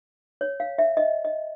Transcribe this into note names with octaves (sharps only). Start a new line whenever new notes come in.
C#5
F5
E5
D#5
D#5